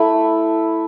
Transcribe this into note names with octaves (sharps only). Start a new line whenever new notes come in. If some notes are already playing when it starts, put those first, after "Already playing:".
Already playing: A3 E4 B5